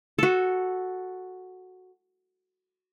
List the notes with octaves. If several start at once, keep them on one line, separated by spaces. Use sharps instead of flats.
F#4 A4